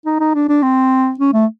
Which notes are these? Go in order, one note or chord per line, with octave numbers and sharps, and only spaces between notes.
D#4
D#4
D4
D4
C4
C#4
A3